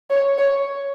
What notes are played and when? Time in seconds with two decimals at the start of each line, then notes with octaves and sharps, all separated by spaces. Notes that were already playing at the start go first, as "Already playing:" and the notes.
0.10 C#5
0.38 C#5